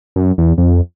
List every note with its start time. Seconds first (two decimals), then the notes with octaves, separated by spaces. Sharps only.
0.16 F#2
0.38 E2
0.58 F2